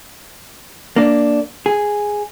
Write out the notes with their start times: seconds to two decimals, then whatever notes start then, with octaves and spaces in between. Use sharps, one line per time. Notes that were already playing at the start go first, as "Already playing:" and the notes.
0.96 A#3 D4
1.66 G#4